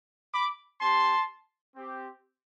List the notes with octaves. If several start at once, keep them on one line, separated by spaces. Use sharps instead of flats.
B5 D6
C4 G4 A5 C6
C4 G4